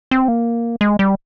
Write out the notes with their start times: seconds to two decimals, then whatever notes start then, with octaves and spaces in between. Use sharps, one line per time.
0.11 C4
0.28 A#3
0.81 G#3
0.99 G3